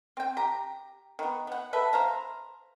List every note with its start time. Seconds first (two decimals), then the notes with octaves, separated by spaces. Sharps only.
0.17 C4 G5
0.37 G4 A#5
1.19 D#3 B3
1.47 B3 F#5
1.73 A4 B4 E5
1.93 C5 F5 A#5